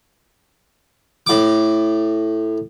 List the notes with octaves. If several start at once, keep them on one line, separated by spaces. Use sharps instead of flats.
A2 D6